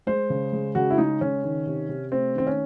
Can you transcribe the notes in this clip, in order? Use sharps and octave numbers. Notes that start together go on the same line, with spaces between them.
G#3 C5
C#3
G#3
C#3 F#4
E4
G#3 D#4
C#3 C#4
D#3
C3
C3
A3 C4
D#3 C4
C#4